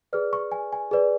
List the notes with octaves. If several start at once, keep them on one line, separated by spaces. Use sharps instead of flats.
G#4 B4 D5 F6
C#6
G#5
G#5
G#4 B4 D5